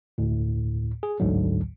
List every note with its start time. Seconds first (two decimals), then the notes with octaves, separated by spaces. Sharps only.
0.18 D2 A2
1.03 G#4
1.20 A1 D2 G#2 D3 F#3